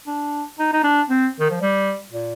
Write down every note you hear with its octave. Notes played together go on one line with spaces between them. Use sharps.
D4
D#4
D#4
D4
C4
D#3
F3
G3
A#2